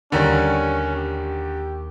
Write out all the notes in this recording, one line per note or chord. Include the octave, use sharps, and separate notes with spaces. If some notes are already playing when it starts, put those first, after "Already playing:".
D#2 D3 D#3 G3 C#4 A#4 G#6
G4